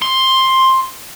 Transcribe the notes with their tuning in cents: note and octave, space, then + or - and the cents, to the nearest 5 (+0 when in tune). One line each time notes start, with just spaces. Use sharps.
C6 +10